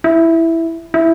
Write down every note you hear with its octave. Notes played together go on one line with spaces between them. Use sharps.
E4
E4